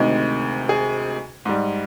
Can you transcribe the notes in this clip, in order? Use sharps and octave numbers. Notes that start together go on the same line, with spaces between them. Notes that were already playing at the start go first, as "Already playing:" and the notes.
Already playing: D2 C3 D#3 G#3
G#4
G#2 G3